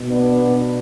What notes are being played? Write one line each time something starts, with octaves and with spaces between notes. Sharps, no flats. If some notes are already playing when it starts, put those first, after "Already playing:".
Already playing: B2
B3 D4
B2